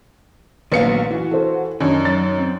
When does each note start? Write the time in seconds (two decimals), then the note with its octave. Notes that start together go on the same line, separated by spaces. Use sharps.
0.72 A#1 D#3 F#3 A3 B3 D5 F5 C#7
1.11 E3 F#4
1.31 A4 C5
1.80 F#2 D#3 D4 D#4 C#5
2.05 F#3 D5 A6
2.38 C4